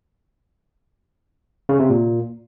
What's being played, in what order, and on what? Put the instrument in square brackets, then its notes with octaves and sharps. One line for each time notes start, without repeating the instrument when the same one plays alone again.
[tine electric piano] C#3
C3
A#2